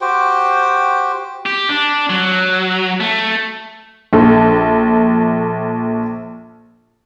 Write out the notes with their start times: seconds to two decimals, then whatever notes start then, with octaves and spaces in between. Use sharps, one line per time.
0.01 F#4 G4 C5 G5
1.46 G4
1.69 D4
2.10 F#3
3.00 A3
4.13 A#1 A4